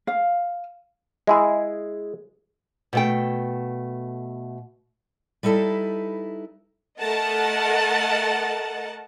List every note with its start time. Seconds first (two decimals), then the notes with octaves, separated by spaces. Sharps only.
0.07 F5
1.27 G#3 E4 G#4
2.93 B2 A3 G5
5.43 G3 D#4 E4 A4 B4
7.00 A3 A#4 D#5 F#5 A5